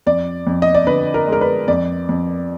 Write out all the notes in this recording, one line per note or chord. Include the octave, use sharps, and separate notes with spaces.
F2 D5
F2
D#5
D5
D3 B4
A#4
G#3
A#4
B4
F2 D5
F2